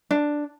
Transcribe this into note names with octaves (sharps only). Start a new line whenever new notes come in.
D4